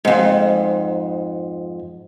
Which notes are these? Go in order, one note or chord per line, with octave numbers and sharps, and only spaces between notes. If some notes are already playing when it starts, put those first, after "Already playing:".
F2 G#2